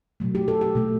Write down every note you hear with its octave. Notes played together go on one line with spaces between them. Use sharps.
B2 F#3 A3
G4
A4
G4
B2 A3